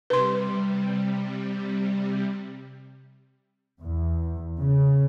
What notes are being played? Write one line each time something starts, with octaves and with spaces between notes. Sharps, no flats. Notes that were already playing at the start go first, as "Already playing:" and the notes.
C3 G3 B4 C6
E2
C#3